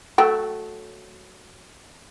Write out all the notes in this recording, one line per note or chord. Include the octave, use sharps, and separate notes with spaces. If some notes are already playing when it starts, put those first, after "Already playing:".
F#3 A3 G5